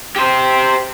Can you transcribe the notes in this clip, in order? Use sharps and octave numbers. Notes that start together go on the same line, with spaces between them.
G4 C5